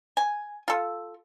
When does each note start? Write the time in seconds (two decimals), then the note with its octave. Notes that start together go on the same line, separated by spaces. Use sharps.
0.17 G#5
0.68 F4 A4